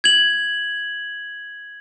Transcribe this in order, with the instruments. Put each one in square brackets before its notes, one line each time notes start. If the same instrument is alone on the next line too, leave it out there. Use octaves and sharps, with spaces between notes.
[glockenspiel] G#6 F#7